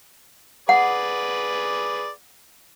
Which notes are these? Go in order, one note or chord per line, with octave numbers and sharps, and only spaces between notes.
G#4 B4 D5 F#5